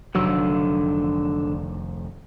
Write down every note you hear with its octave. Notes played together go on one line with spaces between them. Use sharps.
F1 D3 D#3 F#3 E6